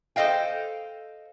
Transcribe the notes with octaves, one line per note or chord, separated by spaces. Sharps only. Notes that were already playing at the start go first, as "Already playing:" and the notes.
A4 C5 D#5 F5 G5